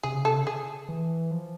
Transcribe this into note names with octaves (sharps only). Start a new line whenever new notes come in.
C3 G#4
C#3
C3 A4
C#3
G#4
E3
F3